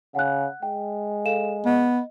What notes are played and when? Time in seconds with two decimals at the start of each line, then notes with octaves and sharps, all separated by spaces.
0.15 C#3 F#5 F#6
0.63 G#3 G5
1.25 A4 F5 E7
1.66 B3 D#5